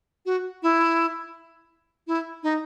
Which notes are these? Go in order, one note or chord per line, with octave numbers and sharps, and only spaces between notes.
F#4
E4
E4
D#4